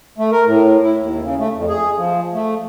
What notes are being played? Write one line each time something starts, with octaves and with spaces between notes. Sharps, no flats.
A3
A#4
A2
E4
D#2
C#3
A3
F2
G#4
F3
A3